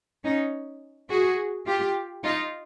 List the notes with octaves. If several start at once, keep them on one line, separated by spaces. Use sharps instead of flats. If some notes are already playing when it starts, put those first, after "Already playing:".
C#4 D#4
F#4 G#4
F4 G4
D#4 F4